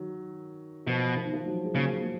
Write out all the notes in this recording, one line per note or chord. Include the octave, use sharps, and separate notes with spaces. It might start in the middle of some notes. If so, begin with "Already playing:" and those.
Already playing: D#3 F#3
B2 F3
F3
D#3
F3
D#3 F#3
G#3
C#3 F#3 A#3
A#3
G#3